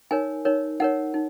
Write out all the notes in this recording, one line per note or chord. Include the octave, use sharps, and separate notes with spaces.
D#4 A#4 C#5 G#5
D#4 A#4 C#5
D#4 A#4 C#5 F#5
D#4